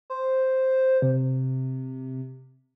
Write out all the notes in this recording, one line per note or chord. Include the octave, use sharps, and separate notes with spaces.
C5
C3